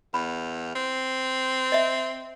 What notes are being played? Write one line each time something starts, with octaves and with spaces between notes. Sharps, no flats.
E2 B5
C4
D#5 E5